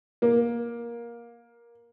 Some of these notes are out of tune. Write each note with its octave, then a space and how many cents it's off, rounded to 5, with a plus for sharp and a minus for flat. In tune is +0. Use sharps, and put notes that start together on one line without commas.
A#3 +15